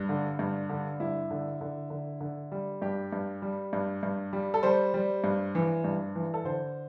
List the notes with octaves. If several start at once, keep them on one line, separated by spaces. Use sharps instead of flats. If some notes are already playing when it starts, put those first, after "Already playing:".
Already playing: G2
D3
G2
D3
G2 E4
D3
D3
D3
D3
G3
G2 G4
G2
G3
G2
G2
G3
A4
G3 C5
G3
G2
E3
G2
E3
A4
D3 C5